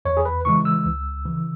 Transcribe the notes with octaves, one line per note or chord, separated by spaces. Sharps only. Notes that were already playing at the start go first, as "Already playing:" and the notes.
E2 C#5
G#4
B4
C#3 E3 G#3 C#6
E6
C#2
C#3 E3